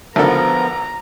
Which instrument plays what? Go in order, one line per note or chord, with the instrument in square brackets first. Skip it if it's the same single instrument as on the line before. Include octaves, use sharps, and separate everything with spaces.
[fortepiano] G#1 D3 A4 [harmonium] F3 B3 A#4 [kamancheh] A#5